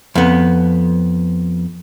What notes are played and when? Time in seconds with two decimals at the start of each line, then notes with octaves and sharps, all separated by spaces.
0.15 F2 B3